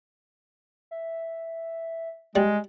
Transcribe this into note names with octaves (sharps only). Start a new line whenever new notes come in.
E5
G3 G#3